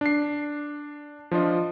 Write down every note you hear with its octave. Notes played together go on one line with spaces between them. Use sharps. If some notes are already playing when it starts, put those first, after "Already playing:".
D4 C7
F3 D4 F4 D#5